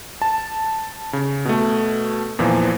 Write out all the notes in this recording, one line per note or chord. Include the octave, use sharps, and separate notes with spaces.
A5
C#3
B2 A3
E2 A#2 E3 F3